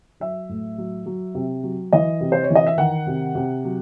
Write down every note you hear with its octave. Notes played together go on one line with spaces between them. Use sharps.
F#3 E5
A2
F#3
F#3
C3
F#3
E3 D#5
C3
C5
C#5
E3
D#5
E5
D#3 F#5
C3
C3
F#3